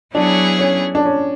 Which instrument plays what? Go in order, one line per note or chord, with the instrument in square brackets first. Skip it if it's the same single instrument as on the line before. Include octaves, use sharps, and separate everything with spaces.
[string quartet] F#3 B3 E4 G#4 C#5 [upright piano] D4
[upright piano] C#4
D4
C#4